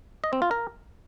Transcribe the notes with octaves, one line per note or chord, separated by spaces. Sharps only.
D#5
C4
F4
A#4